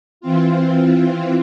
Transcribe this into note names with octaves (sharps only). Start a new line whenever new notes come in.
E3 C4 F4